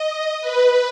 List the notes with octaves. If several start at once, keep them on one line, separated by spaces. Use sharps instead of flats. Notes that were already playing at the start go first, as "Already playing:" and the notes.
Already playing: D#5
B4